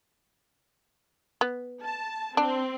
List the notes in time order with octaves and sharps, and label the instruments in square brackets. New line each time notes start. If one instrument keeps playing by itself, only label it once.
[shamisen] B3
[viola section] A5
[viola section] C4 [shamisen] D4